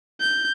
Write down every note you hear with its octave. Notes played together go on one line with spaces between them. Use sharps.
G6